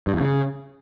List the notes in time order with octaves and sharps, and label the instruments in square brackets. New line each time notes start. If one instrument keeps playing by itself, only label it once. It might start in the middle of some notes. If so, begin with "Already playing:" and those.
[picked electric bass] G2
E2
C#3